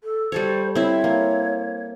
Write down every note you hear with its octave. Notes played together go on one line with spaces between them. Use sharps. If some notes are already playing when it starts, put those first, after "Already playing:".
A4
G3 A4 C5 C#5
C4 E4 C#5
A#3